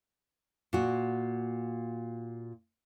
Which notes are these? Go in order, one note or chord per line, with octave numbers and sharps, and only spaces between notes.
A#2 F#4